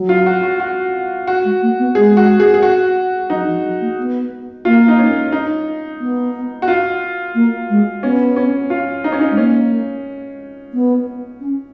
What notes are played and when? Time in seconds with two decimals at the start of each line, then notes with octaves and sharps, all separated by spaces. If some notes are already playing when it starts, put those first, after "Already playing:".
Already playing: F#3
0.09 F4
0.26 F#4
0.43 F#4
0.60 F#4
1.27 F#4
1.44 G#3
1.62 A#3
1.79 B3
1.95 G#3 G#4
2.17 F#4
2.40 G#4
2.54 G#4
2.63 F#4
3.30 F#3 D#4
3.46 F3
3.64 F#3
3.80 A#3
3.98 B3
4.65 A#3 F4
4.88 D#4
4.99 C#4
5.32 D#4
6.00 B3
6.62 F#4
6.68 F4
7.35 A#3
7.69 G#3
8.03 B3 C#4
8.36 C#4
8.70 F4
9.04 D#4
9.12 C#4
9.21 D#4
9.30 G#3
9.37 A#3 C#4
10.73 B3
11.40 C#4